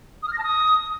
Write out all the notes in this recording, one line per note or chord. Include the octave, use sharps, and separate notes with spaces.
D#6
F6
A#6
A5
D#6